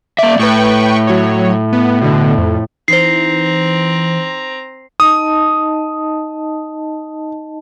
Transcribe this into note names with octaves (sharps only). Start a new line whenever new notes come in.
A#3 D5 E5
A2 B4 G5 C#6
F#3 C#5
B3
B2 D3
F2
E3 C4 D#4 C5 A#5 C7
D#4 D#5 A5 D#6